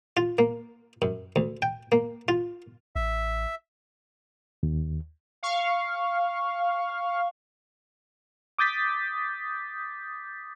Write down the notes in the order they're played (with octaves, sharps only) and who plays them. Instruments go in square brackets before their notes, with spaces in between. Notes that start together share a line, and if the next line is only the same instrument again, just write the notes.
[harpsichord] F4
A#3
F#2
D2
G5
A#3
F4
[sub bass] A1 [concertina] E5
[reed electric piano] D#2
[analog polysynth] F5 C#6
[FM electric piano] D6 D#6 G6 A6 B6